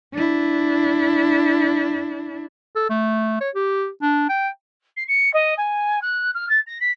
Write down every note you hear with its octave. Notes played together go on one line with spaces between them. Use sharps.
D4 E4
A4
A3
C#5
G4
D4
G5
C7
C#7
D#5
G#5
F#6
F6
A6
A#6
B6